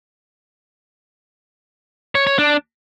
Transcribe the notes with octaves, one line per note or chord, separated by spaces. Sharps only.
C#5
C#5
D4